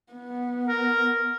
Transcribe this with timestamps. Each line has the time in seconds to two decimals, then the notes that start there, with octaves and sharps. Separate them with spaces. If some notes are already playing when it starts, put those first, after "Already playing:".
0.13 B3
0.67 A#4